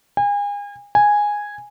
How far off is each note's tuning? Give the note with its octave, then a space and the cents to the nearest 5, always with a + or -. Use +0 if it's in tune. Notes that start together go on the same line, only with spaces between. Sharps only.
G#5 -35
G#5 -5